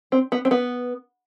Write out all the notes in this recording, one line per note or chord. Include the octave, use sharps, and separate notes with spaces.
C4
B3
C4
B3